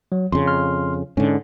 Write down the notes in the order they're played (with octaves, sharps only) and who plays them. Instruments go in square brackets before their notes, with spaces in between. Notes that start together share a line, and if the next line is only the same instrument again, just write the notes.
[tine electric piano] F#3
[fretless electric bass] F2 C#3 [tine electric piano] C6
[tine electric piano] C6 F6
[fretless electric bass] G#2 D3 [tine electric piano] C#4